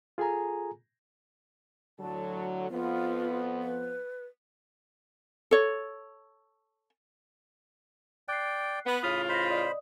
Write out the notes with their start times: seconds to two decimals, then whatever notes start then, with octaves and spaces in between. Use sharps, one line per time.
0.18 F4 G#4 A4 G#5 A#5
1.99 A2 D3 F#3 A5
2.70 F2 F3 B3 F4
3.62 B4
5.51 A4 C#5
8.28 D5 G5 F#6 C7
8.86 B3
9.03 A2 C#3 F4 B5 D#6
9.29 C5 D#5 B5 A#6
9.50 D5 D#5 D#6